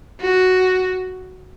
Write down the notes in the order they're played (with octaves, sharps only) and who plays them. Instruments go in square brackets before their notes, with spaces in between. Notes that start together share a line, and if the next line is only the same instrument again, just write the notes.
[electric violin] F#4